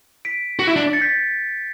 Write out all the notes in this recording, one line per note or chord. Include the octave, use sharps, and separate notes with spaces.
B6 D7
F#4
E4
D4
A6 C#7
G6 B6